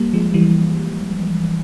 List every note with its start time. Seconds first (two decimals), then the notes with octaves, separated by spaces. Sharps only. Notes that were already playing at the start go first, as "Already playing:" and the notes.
Already playing: G3 A#3
0.13 F3 G#3
0.34 E3 G3